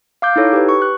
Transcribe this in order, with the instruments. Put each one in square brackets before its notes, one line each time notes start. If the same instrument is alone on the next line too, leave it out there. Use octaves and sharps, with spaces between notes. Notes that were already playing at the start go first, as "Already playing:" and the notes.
[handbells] F5 D6 G6
D#4 E4 A4 C#5
G4 B4
C#6
F#6